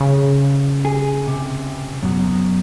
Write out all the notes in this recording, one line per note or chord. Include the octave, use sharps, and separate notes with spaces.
C#3
G#4
C3
F#2 B2 F#3